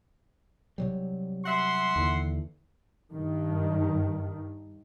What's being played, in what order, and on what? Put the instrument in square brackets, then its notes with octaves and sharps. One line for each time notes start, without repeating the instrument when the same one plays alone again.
[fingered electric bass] C3 F#3 G3
[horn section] E5 F#5 C6
[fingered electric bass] D#2 D3 E3
[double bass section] G2 D#3